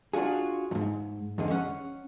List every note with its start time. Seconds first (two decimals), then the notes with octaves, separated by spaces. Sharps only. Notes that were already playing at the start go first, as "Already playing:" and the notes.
0.13 D4 F4 F#4 G#4
0.71 F2 G#2
1.38 F2 D3 G#3
1.51 C#4 F#5